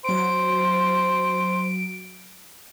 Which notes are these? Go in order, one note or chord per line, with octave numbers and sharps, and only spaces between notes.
F#3 C5 D7